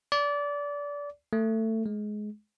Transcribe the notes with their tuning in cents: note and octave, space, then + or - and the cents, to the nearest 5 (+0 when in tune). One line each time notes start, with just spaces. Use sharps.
D5 -25
A3 +20
G#3 +20